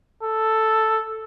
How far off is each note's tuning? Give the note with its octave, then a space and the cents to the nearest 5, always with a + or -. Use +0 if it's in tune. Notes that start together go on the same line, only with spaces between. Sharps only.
A4 +0